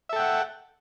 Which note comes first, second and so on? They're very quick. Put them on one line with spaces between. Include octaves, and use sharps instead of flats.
E5 A4 G5 F#5